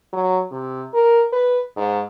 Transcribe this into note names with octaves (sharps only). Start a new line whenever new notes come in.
F#3
C3
A#4
B4
G#2